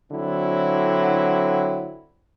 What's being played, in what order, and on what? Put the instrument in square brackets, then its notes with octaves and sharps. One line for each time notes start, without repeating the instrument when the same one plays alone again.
[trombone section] D3 F#3 C4 E4